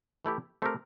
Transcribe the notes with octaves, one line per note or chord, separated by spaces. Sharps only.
E3 A3 E4 G4
A3 C4 G4 A#4